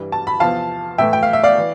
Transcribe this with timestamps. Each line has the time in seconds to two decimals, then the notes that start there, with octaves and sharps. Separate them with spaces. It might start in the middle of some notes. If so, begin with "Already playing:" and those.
Already playing: G2 E3 G3
0.12 A5
0.27 B5
0.40 E2 C3 F3 C4 F5 A5
0.98 A2 E3 A3 E5 G5
1.13 G5
1.23 F5
1.33 E5
1.44 D5 F5
1.58 E3